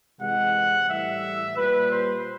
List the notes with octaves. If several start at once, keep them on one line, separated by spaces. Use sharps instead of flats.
C3 E3 G#3 F#5
A2 E3 G3 E5
A#2 G3 B4
C5